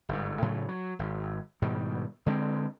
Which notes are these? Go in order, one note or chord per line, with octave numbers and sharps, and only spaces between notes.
G1 G#2
A2 C#3 F#3 A3
F#3
G#1
G#2 B2 D#3 G3
D3 G#3 B3 C4